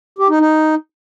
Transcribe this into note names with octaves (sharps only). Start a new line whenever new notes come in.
G4
D#4
D#4